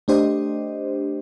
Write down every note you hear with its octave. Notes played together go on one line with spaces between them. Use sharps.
A3 D4 G4 C5 D#5